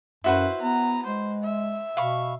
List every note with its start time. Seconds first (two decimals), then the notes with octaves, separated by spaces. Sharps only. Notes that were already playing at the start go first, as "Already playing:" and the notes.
0.24 F#2 E4 F#4 B4 C5
0.61 B3 A#5
1.06 G#3 C5
1.43 E5
1.97 B2 F5 B5 C#6